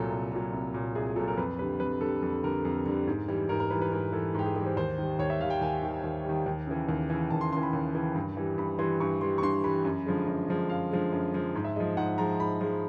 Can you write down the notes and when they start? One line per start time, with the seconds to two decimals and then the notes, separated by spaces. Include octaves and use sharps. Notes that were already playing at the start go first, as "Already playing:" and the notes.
Already playing: C2 A#2 F#3 A4
0.10 C2
0.32 A#2 F#3
0.52 C2
0.74 A#2 F#3
0.95 C2 G#4
1.06 G#4
1.16 A#2 F#3 A4
1.28 A#4
1.38 F2 B4
1.59 D3 G3 B4
1.80 F2 B4
2.01 D3 G3 A4
2.23 F2 A4
2.43 D3 G3 A#4
2.65 F2
2.86 D3 G3
3.07 G#2
3.28 E3 G3
3.49 G#2 A#4
3.60 A#4
3.71 E3 G3 B4
3.82 B4
3.92 G#2 A#4
4.13 E3 G3 A4
4.35 G#2 G4
4.45 G#4
4.55 E3 G3 G#4
4.66 C5
4.77 D#2 C5
4.98 D#3 G3
5.19 D#2 C#5
5.30 E5
5.40 D#3 G3 F5
5.50 G5
5.61 D#2 G#5
5.83 D#3 G3
6.04 D#2
6.24 D#3 G3
6.46 D#2
6.67 C#3 E3
6.89 D#2
7.10 C#3 E3
7.30 D#2 A5
7.41 C6
7.52 C#3 E3 C6
7.63 B5
7.73 D#2
7.95 C#3 E3
8.15 G2
8.37 E3 G3
8.58 G2 B5
8.79 E3 G3 C6
9.00 G2 C#6
9.21 E3 G3 C6
9.38 C#6
9.42 G2 C6
9.64 E3 G3 B5
9.85 F#2
10.06 D3 F3 G#3
10.27 F#2
10.48 D3 F3 G#3
10.69 F#2 F5
10.91 D3 F3 G#3
11.13 F#2
11.34 D3 F3 G#3
11.55 G#2
11.65 E5
11.76 F3 G#3 D#5
11.97 G#2 F#5
12.18 F3 G#3 A#5
12.40 G#2 B5
12.61 F3 G#3